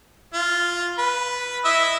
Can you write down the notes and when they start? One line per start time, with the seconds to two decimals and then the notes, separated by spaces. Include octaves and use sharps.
0.34 F4
0.98 B4
1.65 E4 D#5 E5